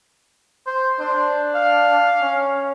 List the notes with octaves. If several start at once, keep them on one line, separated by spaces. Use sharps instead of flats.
C5
D4 C5
F5
C#4